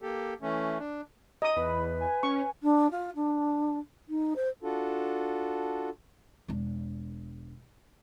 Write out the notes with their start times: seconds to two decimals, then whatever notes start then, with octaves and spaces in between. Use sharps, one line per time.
0.01 A#3 G4 A4
0.42 E3 A3 C#4
0.79 D4
1.42 D#5 A#5 D#6
1.56 E2 B4 B5
2.00 G#5
2.23 C#4 C#6
2.62 D4
2.90 F4
3.15 D4
4.08 D#4
4.35 C5
4.63 D4 F4 F#4 A4
6.48 E1 D4